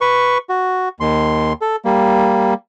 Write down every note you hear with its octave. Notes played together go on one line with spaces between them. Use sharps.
B4 C#6
F#4
D#2 C6
A4
G3 A#3